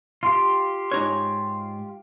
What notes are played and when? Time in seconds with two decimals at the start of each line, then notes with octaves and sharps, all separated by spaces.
0.23 F4 G4
0.92 G#2 D#4 C#5